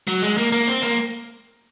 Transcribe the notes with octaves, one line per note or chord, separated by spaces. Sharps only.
F#3
G#3
A#3
A#3
C4
A#3